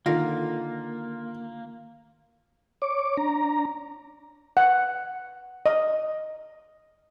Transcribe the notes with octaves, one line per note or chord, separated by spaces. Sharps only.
D3 D#3 A#3 F4 A#4
C#5 D6
D4 A#5
F#5
D#5